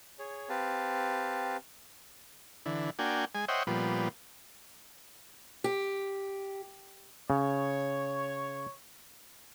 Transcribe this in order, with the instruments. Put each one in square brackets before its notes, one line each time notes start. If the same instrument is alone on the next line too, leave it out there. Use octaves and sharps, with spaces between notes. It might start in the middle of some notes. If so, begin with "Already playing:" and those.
[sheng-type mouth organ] G#4 C#5
C4 G4 B4 F5 A5
[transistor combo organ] D3 E3
A#3 D4 F#4 G5 G#5
G#3 G#5
C5 C#5 D#5 E5 F#5 G5
A#2 F3 G3 B3
[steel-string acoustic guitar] G4
[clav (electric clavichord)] C#3 [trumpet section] C#5